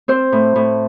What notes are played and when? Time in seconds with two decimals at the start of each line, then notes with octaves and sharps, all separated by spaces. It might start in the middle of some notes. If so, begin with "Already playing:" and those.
0.08 C4 C5
0.32 A2
0.55 A2